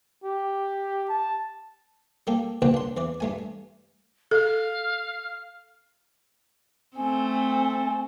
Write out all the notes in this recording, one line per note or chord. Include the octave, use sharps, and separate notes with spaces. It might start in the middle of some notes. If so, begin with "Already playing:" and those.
G4
A5
G3 A#3 G4 A4
A#1 G2 C#3 A#3 B4 G5
D4 C6
E2 E3 D5
G2 A3 G#5
A4 F5
A3 C4 G#5